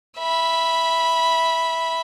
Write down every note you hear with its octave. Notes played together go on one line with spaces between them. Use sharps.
E5 B5